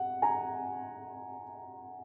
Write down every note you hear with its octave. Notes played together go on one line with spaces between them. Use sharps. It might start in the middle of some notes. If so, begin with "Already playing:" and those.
Already playing: F#5
G#5 A#5